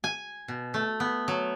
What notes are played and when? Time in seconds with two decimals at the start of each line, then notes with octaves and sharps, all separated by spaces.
0.04 G#5
0.48 B2
0.74 A3
1.00 B3
1.28 F#3